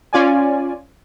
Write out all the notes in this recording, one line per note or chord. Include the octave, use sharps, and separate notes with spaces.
C#4 F4 D5 G#5